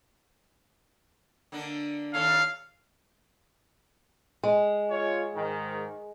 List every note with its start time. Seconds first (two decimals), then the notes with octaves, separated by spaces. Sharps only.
1.52 D3 A#3 D4
2.14 D#2 A4 C#5 F5
4.44 G#3
4.91 F4 C#5
5.36 G#2 D#3